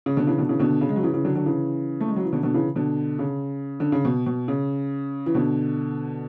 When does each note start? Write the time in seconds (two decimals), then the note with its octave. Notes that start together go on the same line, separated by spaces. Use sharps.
0.06 C#3
0.17 B2 D3
0.27 C#3 E3
0.38 B2 D3
0.49 C#3 E3
0.59 B2 D3
0.81 C#3
0.89 G#3
0.96 F#3
1.03 C#3 E3
1.14 C#3 E3
1.25 D3 F#3
1.35 D3 F#3
1.46 C#3 E3
2.01 A3
2.09 G#3
2.16 F#3
2.24 E3
2.33 B2 D3
2.43 B2 D3
2.54 C#3 E3
2.76 B2 D3
3.19 C#3
3.80 D3
3.92 C#3
4.05 B2
4.26 B2
4.48 C#3
5.26 E3
5.35 B2 D3